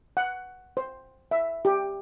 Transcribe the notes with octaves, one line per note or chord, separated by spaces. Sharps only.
F#5
C5
E5
G4